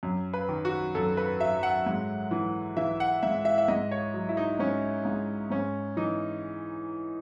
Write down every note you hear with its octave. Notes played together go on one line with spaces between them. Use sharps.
F#2
B4
D#3
F#4
F#2 A4
B4
F#3 E5
F#5
G#2
E3
E3 E5
F#5
G#2 E5
E5
E5
G#2 D#5
C#5
F#3
E4
D#4
G#2 C#4
G#2
G#2 C#4
E3 D#4